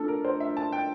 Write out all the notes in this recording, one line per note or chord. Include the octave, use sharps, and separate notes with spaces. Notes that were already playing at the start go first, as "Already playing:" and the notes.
Already playing: A3 D4 F4 A4
A#4
C5
E5
A5
G5